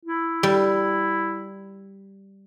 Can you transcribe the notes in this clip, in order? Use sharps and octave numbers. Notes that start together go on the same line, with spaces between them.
E4
G3